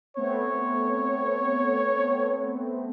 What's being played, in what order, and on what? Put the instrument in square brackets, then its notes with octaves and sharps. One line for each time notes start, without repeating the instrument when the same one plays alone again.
[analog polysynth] A3 B3 C4 [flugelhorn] C#5